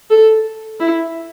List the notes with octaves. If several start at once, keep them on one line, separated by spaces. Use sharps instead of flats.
A4
E4